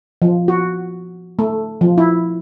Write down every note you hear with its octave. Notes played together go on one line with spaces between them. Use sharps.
F3
F#4
A3
F3
E4